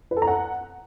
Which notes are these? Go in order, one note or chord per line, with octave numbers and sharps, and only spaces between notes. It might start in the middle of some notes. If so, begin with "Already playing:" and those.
B4
A4
A#5
F#5